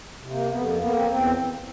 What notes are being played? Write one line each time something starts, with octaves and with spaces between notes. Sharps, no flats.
C3
A#3
F2 B3
A#3
A#3 B3
C4
E2 C4